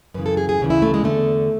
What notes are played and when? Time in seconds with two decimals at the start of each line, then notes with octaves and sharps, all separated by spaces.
0.14 F#2 C#3 E3 B4
0.26 A4
0.37 G#4
0.49 G#4
0.60 D2 C#3 E3
0.70 E4
0.82 A3
0.94 G#3
1.04 E2 D3 A3